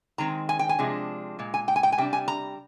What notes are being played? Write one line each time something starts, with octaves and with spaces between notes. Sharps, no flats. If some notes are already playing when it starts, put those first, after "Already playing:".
D#3 G#3 C4 A#5
G#5
G5
G#5
C3 F3 G#3 D4
A#2 G#3
G#5
G5
G#5
G5
G#5
C3 G3 D4 G5
G#5
A#5